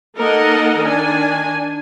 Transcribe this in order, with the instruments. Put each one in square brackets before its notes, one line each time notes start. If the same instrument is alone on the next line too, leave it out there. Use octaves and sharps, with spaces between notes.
[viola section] A#3 D#4 A4 A#4 D#5 F#5
D#3 D4 G#5